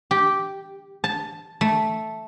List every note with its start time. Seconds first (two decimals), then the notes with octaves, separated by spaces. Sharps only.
0.11 G4
1.04 A5
1.61 A3